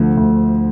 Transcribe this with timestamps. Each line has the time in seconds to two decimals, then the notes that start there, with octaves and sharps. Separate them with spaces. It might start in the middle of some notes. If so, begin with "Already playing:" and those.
Already playing: D2 D3 F3 A3
0.17 D2